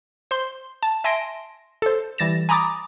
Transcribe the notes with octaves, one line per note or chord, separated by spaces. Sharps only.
C5 C6
A5
E5 G#5 A5 C6 A#6 D7
A4 C5
E3 G3 A6 A#6 E7
G#5 A#5 B5 D6 D#6 A6